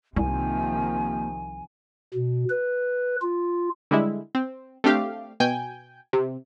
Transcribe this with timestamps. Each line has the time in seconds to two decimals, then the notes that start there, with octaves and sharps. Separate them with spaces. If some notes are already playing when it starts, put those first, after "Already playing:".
0.16 C2 C3 D#3 F3 A#3 G#5
2.14 B2
2.50 B4
3.22 F4
3.91 D3 G3 G#3 E4
4.35 C4
4.84 A3 C4 D4 G4 F5
5.40 B2 G5 G#5 G6
6.13 C3